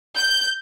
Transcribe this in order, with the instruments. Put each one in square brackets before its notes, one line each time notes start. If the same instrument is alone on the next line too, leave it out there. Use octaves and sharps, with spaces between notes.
[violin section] G6